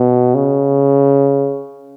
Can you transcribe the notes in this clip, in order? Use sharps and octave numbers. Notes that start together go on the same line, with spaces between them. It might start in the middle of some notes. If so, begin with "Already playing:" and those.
Already playing: B2
C#3